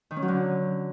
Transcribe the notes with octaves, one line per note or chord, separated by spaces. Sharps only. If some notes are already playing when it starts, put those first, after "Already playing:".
D#3
C#4
F#3
D3